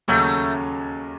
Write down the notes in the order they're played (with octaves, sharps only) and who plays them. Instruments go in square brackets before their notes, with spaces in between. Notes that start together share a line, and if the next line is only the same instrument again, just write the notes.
[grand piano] D#2 C#3 F#3 C#4 [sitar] A3